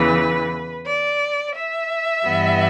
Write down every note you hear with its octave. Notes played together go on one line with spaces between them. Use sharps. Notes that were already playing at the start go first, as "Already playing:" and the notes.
Already playing: E2 C#3 E3 B4
D5
E5
G2 E3 G3 B3